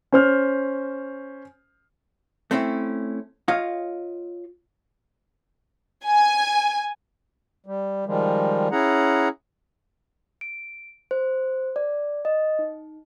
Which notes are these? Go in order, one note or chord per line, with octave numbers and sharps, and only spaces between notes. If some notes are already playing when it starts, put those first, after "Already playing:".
C#4 C5 F6
A3 C4 C#4 E4
F4 C#5 D#5 F5
G#5
G3
D#3 F3 G3 G#3
C#4 E4 G#4 F#5 A#5
D7
C5
D5
D#5
D#4